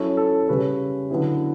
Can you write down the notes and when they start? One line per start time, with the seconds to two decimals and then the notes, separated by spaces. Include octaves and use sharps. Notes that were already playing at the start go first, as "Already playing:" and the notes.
Already playing: F#3 C#4 E4 A4
0.17 A4
0.48 C#3 G3 C#4 B4
1.10 D3 F#3 B3 E4